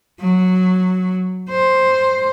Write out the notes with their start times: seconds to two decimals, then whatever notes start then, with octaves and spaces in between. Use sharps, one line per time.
0.20 F#3
1.50 C5